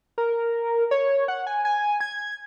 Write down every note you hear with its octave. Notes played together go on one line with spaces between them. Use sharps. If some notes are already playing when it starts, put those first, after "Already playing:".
A#4
C#5
F#5
G#5
G#5
G#6